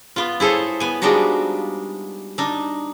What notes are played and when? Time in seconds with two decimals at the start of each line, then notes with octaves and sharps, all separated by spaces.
0.16 B3 F4
0.40 E4 G#4 A4 C5 C#5
0.80 B3 G#5
1.02 F3 G3 G#3 D4 D#4 F#4
2.38 D4 D#4